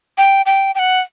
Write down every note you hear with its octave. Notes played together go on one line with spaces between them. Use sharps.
G5
G5
G5
F#5